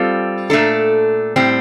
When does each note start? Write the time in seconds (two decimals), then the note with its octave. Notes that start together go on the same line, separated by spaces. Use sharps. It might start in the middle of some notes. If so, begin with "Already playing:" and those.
Already playing: G3 C4 F4 A4
0.50 A#2 A3 D4 A4
1.36 A2 G3 C4